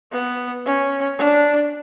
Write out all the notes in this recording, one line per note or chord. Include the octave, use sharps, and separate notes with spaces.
B3
C#4
D4